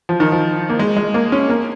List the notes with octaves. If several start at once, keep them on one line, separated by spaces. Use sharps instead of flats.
F3
D#3
F3
A#3
G#3
G#3
A#3
C#4
A#3